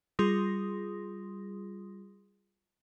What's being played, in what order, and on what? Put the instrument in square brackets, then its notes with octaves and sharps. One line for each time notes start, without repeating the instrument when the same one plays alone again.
[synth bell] G3 F4 G#4 C6 D#6 A#6